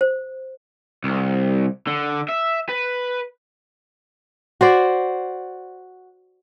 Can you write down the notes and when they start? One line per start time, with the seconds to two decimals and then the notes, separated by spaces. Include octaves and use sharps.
0.01 C5
1.04 C2
1.87 D3
2.29 E5
2.69 B4
4.61 F#4 C5 D5